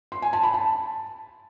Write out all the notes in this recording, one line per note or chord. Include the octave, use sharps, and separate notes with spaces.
C6
G#5
A5
B5
A5